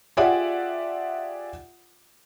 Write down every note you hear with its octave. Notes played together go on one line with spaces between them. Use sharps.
F4 G4 G#4 D5 E5 F#5